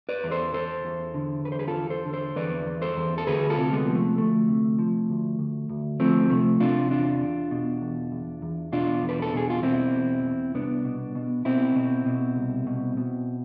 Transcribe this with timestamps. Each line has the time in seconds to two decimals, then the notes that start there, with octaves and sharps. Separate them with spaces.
0.09 B4 D5
0.24 E2
0.31 A4 C5
0.54 E2 A4 C5
0.84 E2
1.14 D3
1.45 E2 B4
1.52 C5
1.59 G#4 B4
1.68 F4 A4
1.75 E2
1.90 A4 C5
2.05 D3
2.13 A4 C5
2.36 E2 B4 D5
2.66 E2
2.81 A4 C5
2.97 E2
3.18 A4
3.27 D2 G#4 B4
3.50 F4 A4
3.57 C3
3.73 G#3 B3
3.87 F3
3.95 A3
4.18 D2 A3
4.48 C3
4.79 F3
5.09 D2
5.39 D2
5.70 D2
6.00 F3 A3 C4
6.30 C3 A3
6.60 C3 D4 F4
6.91 E2 D4 F4
7.21 E2
7.51 B2
7.81 E2
8.12 E2
8.42 E2
8.72 B2 D4 F4
9.03 E2
9.09 B4
9.22 A4
9.34 B2 G#4
9.50 F4
9.63 B2 C4 E4
9.94 E2
10.24 E2
10.54 C2 B3 D4
10.85 B2
11.15 B2
11.45 B2 C4 E4
11.76 B2
12.06 B2
12.36 C2
12.67 B2
12.97 B2